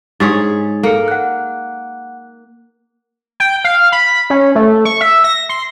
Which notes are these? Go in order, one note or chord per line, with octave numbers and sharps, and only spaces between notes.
G#2 D4 G#4 C#5 A6
A#3 A4 C#7
F#5 F#6
G5
F5
B5
C#4
A3
C#6
E5
A#6
C6